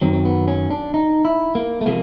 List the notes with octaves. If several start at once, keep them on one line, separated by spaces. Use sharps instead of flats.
F#2 D#3 F#3 C4
C4
B3
C#4
D4
D#4
E4
A#3
A3
C3 F3 G#3 A#3